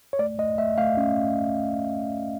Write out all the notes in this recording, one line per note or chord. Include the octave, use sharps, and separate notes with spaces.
C#5
A3 D5
A3 D#5
A3 E5
A3 F5
C#4